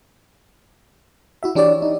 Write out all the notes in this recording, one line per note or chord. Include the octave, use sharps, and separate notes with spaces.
E4 F#4 E5
E3 D4 G4 C#5 D5
D#4